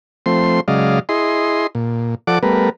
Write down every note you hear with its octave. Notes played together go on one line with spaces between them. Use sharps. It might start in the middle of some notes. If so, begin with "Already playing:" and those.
F3 A3 C4 C6
C#3 F#3 G#3 D5 D#5 F5
E4 G#4 D#5 C6
A#2
F3 A4 D5 F#5 D6
G3 A3 B3 A#4 B4